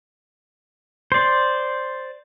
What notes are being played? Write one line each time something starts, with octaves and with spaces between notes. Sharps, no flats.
C5 D5